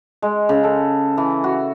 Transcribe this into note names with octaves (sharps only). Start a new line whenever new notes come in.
G#3
C#3
A4
E3
F#4